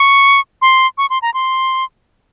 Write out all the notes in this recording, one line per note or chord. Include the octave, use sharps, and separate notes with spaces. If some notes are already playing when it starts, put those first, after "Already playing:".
Already playing: C#6
C6
C#6
C6
A#5
C6